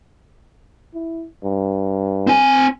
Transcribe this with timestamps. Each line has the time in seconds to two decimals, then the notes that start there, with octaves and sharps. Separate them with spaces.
0.94 E4
1.44 G2
2.27 C4 G#5